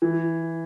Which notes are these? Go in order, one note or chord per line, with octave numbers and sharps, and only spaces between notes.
E3